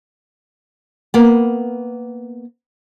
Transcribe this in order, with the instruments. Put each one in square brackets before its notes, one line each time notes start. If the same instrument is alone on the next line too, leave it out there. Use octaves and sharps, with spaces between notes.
[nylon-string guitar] A#3 B3